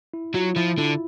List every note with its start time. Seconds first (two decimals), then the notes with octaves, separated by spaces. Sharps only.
0.14 E4
0.34 F#3 F4
0.56 F3 E4
0.77 D3 E4